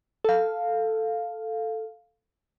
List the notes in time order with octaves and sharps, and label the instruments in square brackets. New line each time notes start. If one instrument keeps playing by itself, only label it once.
[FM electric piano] A4 F5